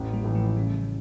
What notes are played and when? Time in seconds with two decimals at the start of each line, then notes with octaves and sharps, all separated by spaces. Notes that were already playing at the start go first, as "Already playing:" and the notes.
Already playing: A1
0.13 G3 A#3
0.24 A2 E3
0.35 F3 A3
0.56 C#3 E3 G3